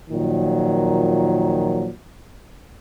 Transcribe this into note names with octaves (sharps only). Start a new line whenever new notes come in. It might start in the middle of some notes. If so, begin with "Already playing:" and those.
A#2 D#3 F3 F#3